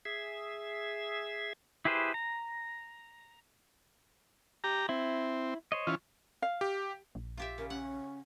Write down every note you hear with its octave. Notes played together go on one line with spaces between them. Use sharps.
G#4 E5
E4 G4 G#4 B4 C5
A#5
G4 A#5
C4 E4
C5 C#5 D#5
E3 C#4 F4
F5
G4
A#1
F4 G4 E5
C#3 A#4
C#4 F#5